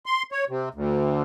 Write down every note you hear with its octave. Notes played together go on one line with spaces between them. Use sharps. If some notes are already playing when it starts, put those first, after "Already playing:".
C6
C#5
C3
D2